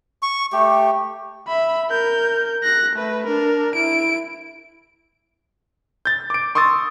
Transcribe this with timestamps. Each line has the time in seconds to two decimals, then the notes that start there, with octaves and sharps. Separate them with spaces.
0.22 C#6
0.53 A3 G4
1.47 E5 B5
1.90 A#4 G6
2.64 F#6 A#6
2.95 A3 B4
3.26 D4 A#4
3.74 E4 D7
6.05 G6 A6
6.30 D6 D7
6.55 C6 C#6 D#6 E6 A6